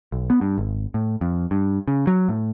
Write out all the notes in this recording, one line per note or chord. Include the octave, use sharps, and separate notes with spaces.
B1
B3
G2
G#1
A2
F2
G2
C#3
F#3
A2